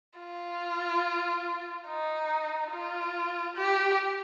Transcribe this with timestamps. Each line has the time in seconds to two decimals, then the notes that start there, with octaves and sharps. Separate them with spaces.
0.20 F4
1.88 D#4
2.71 F4
3.56 G4